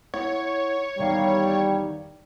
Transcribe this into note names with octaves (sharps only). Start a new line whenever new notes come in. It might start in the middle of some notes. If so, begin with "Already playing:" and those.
E4 C#5 F#5
E2 D#3 G3 F5